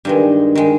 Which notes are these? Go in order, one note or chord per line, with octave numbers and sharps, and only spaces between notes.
G2 D#3 G#3
D#3 G#3